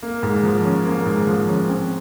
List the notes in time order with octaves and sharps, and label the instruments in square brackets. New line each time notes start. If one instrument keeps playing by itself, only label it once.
[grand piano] A#3
G#2
F3
C#4
A#3
G#2
F3
C#4
C4